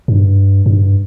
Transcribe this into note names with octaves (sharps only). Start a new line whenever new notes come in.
G2
G2